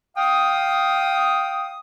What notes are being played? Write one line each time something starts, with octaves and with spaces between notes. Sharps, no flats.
F5 G5 D#6